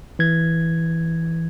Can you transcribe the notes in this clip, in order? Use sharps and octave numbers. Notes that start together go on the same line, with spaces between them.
E3 G#6